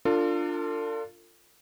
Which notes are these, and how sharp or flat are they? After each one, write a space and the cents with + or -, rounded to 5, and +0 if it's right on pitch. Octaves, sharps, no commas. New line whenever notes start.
D4 +5 F4 +0 A4 +45